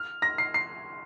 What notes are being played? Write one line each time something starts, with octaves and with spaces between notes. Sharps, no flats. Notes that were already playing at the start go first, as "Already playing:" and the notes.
Already playing: F6
A#6
C7
C7